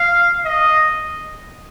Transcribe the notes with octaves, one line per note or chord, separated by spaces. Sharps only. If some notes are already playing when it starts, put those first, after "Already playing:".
Already playing: F5
D#5